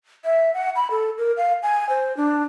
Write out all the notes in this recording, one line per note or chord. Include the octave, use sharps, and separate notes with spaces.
E5
F#5
B5
A4
A#4
F5
G#5
C5
D4